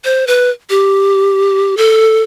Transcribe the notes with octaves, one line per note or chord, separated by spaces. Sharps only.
C5
B4
G4
A4